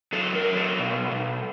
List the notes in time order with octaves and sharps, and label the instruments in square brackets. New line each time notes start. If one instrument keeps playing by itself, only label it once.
[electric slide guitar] F#3 A4
A#4
F#3
A4
B2
B2